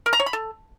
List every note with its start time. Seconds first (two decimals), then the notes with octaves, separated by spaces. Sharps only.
0.06 A#4
0.13 A#5
0.20 C#5
0.26 B5
0.33 A4